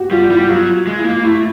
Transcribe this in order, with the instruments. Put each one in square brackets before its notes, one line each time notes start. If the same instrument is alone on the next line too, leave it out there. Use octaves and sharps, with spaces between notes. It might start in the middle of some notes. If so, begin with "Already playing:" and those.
Already playing: [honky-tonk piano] F#4 G4
[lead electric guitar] G3 [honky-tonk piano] F4
[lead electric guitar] G3 [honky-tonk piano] E4
[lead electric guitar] F#3 [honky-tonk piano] F4
[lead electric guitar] G#3
[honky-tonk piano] E4
[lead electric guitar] A#3
[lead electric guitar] A3 [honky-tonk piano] E4